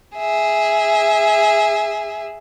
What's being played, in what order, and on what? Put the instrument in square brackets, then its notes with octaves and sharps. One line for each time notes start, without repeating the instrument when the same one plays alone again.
[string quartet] G#4 E5